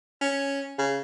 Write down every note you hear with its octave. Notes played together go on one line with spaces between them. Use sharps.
C#4
C#3